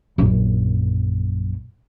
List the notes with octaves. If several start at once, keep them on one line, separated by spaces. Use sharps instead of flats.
A#1 F#2